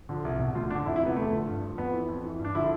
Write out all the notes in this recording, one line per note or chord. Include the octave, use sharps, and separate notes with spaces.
D3 F3
C2
B2
D2 F4
D3 F3 D4
F2 E4
E4
C3 F3 B3
E2 A3
D3 F3
G2
F3
F2 B3
E3
F2
E3
G2
D4
D3 F3 E4